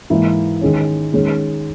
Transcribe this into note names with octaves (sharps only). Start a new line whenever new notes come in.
G#2 E3 A#3 E4
D#3 G#3 C#4
D#3 G#3 C#4